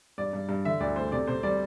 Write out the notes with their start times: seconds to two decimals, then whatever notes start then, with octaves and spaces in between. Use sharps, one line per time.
0.18 G2 D5
0.33 G2
0.49 G2
0.65 D3 E5
0.80 D2 D5
0.96 A3 C5
1.12 C3 D5
1.27 C3 C5
1.43 G3 D5